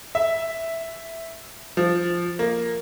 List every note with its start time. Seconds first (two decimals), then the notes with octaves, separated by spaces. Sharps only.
0.15 E5
1.77 F3
2.39 A#3